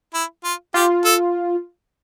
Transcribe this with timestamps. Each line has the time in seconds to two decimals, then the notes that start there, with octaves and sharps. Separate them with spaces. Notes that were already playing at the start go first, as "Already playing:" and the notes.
0.14 E4
0.44 F4
0.74 F4 G4
1.05 A4